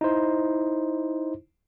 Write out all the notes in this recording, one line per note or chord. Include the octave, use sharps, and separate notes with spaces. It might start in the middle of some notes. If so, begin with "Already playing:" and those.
D#4 E4 C5